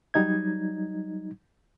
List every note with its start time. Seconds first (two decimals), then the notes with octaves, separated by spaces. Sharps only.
0.14 F#3 G3 D#4 D#5 G#6